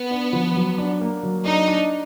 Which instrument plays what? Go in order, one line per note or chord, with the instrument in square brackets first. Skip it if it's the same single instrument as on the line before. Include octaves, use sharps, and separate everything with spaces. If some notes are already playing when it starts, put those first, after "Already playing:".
Already playing: [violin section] B3
[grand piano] D4
F3
F#3
D4
A#3
F#3
[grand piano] D4 [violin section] D#4
[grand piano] D4